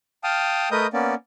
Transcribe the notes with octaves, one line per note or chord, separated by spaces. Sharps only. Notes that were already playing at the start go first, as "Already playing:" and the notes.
F5 G5 A5 D#6 F6
A3 A#4 B4 D#5 D#6 G6
A#3 B3 C#4 D5